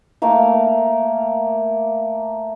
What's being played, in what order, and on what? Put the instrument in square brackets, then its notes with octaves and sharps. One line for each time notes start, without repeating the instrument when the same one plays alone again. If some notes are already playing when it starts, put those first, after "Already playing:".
[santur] A3 A#3 A#4 F5